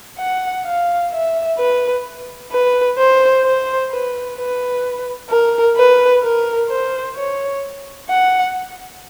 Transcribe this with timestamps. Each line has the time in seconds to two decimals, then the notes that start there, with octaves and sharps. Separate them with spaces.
0.19 F#5
0.66 F5
1.12 E5
1.58 B4
2.51 B4
2.98 C5
3.44 C5
3.90 B4
4.38 B4
5.30 A#4
5.76 B4
6.23 A#4
6.69 C5
7.16 C#5
8.09 F#5